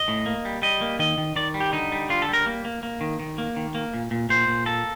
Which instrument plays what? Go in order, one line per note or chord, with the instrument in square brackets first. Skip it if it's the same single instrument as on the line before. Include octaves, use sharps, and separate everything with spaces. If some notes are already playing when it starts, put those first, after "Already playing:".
Already playing: [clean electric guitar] D#5
A2
A#3
G3
G3 D#5
A#3
D#3 D#5
D#3
D#3 D5
G3
G4
D3 D#4
G3
D3 F4
A4
G3
A#4
A#3
A#3
A#3
D#3
D#3
A#3
D#3
A#3
A#2
A#2
A#2 C5
A#2
A#3 A4